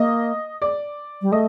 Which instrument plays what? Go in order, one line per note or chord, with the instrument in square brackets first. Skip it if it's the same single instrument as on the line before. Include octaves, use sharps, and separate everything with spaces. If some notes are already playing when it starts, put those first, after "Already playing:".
Already playing: [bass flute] A#3 [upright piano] D#5
[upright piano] D5
[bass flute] G3
[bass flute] A3 [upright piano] D#5